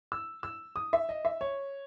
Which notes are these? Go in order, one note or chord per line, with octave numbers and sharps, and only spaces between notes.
E6
E6
D#6
E5
D#5
E5
C#5